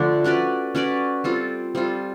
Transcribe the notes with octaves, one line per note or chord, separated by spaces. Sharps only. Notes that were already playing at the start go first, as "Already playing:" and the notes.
Already playing: D3 F3 A3 D4
C#4 F#4 B4 D5
C#4 F#4 B4 D5
G3 C4 F4 A4
G3 C4 F4 A4